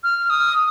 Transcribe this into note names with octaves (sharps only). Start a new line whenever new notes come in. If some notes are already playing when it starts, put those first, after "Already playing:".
F6
D#6